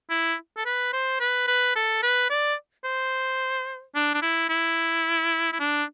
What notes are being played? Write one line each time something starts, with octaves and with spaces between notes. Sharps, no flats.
E4
A4
B4
C5
B4
B4
A4
B4
D5
C5
D4
D4
E4
E4
E4
D4